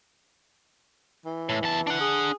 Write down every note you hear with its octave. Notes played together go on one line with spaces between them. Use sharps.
E3
A2
E2 A5
D4 F#5
G#4